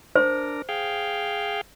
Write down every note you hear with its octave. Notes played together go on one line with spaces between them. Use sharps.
D4 A#4 C5
G#4 F5 G5